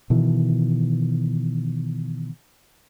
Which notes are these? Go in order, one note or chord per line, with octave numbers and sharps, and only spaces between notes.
B2 D#3 E3